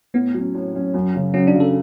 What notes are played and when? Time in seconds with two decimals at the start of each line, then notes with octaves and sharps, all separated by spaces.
0.14 A2 B3
0.34 F#3 C#4
0.54 A2
0.74 F#3 C#4
0.94 F#2
1.14 C#3 F#3
1.34 F#2 C#4
1.47 D4
1.54 C#3 F#3
1.60 A4